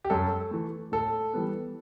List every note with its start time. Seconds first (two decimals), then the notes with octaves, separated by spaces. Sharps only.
0.05 G4
0.10 F#2 A4
0.51 E3 A3
0.92 A2 A4
1.34 E3 G3 B3